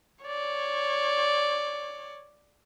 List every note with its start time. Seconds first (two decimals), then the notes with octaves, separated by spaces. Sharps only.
0.24 C#5 D5